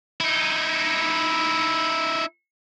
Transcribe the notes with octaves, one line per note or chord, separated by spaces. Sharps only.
D#4 E4